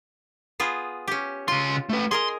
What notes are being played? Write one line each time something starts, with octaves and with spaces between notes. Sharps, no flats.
B3 F4 G#4
C#4 G4
C#3 F4 C6
A3 B4
G#4 A#4 D#5 C6